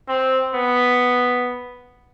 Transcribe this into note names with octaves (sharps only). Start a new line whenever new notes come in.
C4
B3